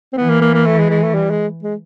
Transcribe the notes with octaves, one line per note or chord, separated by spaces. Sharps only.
C4
E3 B3
A#3
A#3
A#3
A3
G#3
G#3
A3
G3
G#3
G#3